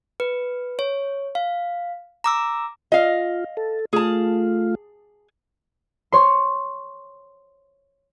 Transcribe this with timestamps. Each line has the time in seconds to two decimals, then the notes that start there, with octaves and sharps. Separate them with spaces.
0.20 B4
0.79 C#5
1.35 F5
2.24 A#5 D6 E6
2.92 F4 D#5 F5
3.57 A4
3.93 A3 F4 G#4 A5
6.12 C#5 C6